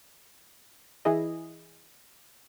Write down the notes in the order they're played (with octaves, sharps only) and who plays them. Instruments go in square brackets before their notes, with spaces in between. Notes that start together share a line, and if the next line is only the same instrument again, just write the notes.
[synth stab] E3 E4 G#4 D#5